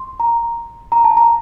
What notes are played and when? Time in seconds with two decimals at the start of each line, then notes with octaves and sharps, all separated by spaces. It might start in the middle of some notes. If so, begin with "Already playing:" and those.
Already playing: C6
0.20 A#5
0.92 A#5
1.04 A5
1.17 A#5